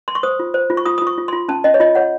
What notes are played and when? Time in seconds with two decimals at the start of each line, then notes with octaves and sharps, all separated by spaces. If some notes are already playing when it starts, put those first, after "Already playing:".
0.08 C6
0.15 C#6
0.23 C5 D#6
0.40 F4
0.54 C5
0.70 F4
0.77 C#6
0.86 F4 D#6
0.98 F4 D#6
1.07 C#6
1.18 F4
1.28 F4 C6
1.48 C#4 A5
1.64 C#4 D#5
1.74 C#5
1.80 F4 D#5
1.95 C#5 F#5